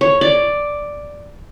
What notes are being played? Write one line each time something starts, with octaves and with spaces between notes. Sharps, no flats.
C#5
D5